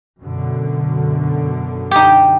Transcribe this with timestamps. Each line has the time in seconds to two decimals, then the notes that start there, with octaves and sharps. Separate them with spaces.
0.19 F#2 B2 D3
1.91 D#4 G4